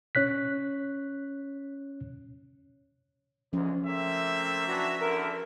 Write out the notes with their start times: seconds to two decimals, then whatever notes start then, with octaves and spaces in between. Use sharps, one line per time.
0.15 C#4 C#5 F#6 B6
3.53 D2 G#2 F3 C#4
3.85 A3 A#3 C4 E5
4.67 E3 F#3 D4 F#4 A#5
5.01 E2 D3 A#4